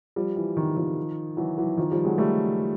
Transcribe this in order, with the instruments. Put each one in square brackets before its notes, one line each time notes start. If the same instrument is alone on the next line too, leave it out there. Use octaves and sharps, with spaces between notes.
[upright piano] F3 G3
E3
D#3
D#3 F3
E3 F#3
E3 F#3
D#3 F3
F3 G3
F#3 G#3
G3 A3